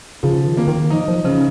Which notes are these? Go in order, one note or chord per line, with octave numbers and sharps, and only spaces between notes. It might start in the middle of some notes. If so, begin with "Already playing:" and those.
C#3 F3
D#3
A#3
D#3
F3 D#4
F3
C#3 F3